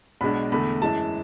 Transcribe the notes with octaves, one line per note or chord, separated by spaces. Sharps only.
B1 B2 G#3 D4 B5
E2 D3 A3 B5
F#2 E3 G#3 A5